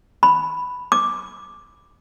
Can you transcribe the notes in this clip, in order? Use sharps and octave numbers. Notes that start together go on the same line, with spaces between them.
B5
D6